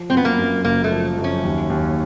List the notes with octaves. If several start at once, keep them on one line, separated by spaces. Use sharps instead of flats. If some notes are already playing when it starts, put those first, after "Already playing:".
Already playing: F3
F#2 C4
B3
A#3
F#2
F#1 A#3
A3
F3
F#2
C#4
D#2
D#2